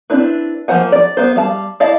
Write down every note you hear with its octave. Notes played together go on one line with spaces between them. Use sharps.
C4 D4 E4 B4
F3 A#3 C5 F#5 G#5
D5
B3 C5
G3 F5 A5
E4 D5 D#5 F5 A5